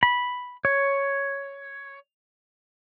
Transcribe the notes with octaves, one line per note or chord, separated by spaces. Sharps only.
B5
C#5